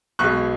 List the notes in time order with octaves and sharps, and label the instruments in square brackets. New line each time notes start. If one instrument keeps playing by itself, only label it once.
[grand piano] B1 B2 G#3 C#6 F#6